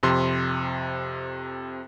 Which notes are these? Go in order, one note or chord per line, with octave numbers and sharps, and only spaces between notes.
F2 C3 C6